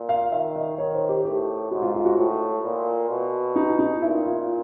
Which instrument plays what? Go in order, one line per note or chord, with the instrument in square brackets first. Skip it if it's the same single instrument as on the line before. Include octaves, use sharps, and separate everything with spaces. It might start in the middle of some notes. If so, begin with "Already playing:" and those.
Already playing: [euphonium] A#2
[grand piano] F5
[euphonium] D#3 [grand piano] E5
[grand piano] D#5
[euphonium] D#3 [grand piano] C#5
[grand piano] C5
G4
[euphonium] A2 [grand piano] G4
[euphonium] G#2 [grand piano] F#4
[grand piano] F4
F4
F#4
[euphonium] A2
A#2
B2
[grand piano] D#4
D#4
[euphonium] A#2 [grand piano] E4
[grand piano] F4